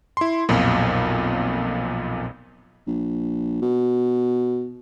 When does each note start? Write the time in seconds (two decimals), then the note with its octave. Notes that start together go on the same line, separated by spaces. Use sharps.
0.17 E4 C6
0.49 B1 F2 A#2
2.87 A#1
3.62 B2